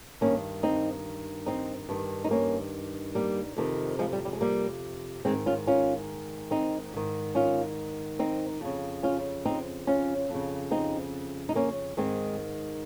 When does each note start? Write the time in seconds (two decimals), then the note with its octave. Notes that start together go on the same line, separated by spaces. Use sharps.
0.21 G2 D#3 A#3 C#4
0.63 C4 D#4
1.46 C4 D#4
1.89 G2 D#3
2.24 D#4
2.31 A#3 C#4
3.15 G3 A#3
3.57 F2 C3 D#3
3.99 F3 G#3
4.13 G3
4.25 G3
4.33 G#3
4.41 G3 A#3
5.25 G#2 D#3 G#3 C4
5.46 C#4 F4
5.67 C#4 F4
6.51 C4 D#4
6.94 G#2 D#3
7.35 C#4 F4
8.19 C4 D#4
8.61 F2 C#3
9.03 C#4 F4
9.45 C4 D#4
9.87 C#4 F4
10.29 F2
10.34 C#3
10.71 C4 D#4
11.49 D#4
11.55 A#3 C#4
11.97 G#2 D#3 G#3 C4